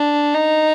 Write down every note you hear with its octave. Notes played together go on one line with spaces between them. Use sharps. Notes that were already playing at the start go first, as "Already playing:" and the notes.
Already playing: D4
D#4